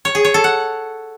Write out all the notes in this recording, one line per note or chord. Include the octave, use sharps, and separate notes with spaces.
C#5
G#4
C#5
A4
F#5